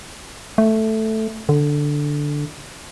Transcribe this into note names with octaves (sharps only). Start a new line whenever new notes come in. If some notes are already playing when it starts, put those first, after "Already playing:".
A3
D3